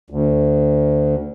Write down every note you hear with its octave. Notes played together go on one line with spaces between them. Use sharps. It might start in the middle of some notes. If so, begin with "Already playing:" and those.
D2